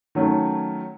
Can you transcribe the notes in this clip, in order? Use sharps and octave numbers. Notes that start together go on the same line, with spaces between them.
D#3 F#3 A3 C#4